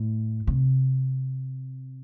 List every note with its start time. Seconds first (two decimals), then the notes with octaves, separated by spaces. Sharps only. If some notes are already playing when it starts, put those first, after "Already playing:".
Already playing: A2
0.47 C3